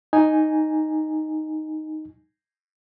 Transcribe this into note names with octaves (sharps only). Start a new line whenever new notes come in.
D#4 G#5